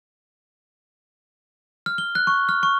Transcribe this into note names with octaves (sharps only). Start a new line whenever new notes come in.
F6
G7
F#6
C#6
F6
C#6